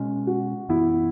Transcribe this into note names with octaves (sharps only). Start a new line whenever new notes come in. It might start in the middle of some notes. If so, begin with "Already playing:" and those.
Already playing: B2 G#3 C#4
F#4
F#2 E3 B3 E4